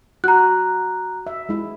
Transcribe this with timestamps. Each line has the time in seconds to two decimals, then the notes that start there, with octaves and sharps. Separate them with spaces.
0.24 F#4 A#5 F#6
1.27 E5
1.49 G#3 E4